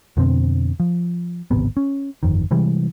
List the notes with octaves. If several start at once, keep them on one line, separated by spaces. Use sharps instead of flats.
F2 B2 D3 C4
F3
D1 G#1 C3 B3
C#4
G1 F2 D#3
C3 E3 G3 G#3